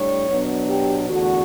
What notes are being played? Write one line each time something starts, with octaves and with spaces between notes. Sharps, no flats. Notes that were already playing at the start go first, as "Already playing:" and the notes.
Already playing: A2 G3 D4 C#5
B2 F#3 B3 D4
G4
E2 D3 A3 F#4